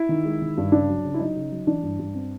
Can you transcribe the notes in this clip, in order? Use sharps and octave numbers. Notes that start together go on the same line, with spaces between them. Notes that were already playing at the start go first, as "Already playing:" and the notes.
Already playing: E4
D#3
G#3
D#3
G2
C#3 D4
F#3
C#3
E4
F#3 D#4
C#3
F#3
E3 D4
G2
G2
C4